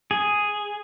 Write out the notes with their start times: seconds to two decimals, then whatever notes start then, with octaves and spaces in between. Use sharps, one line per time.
0.11 G#4